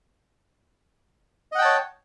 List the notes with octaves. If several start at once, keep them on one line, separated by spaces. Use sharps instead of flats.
C#5 D#5 F#5 G5 A5